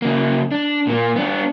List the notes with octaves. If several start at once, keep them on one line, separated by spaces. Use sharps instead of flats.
C#3 A#3
D4
A#2 A#3
B3 D4